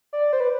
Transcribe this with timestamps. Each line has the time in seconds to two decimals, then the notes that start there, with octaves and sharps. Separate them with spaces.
0.13 D5
0.33 C5
0.40 B4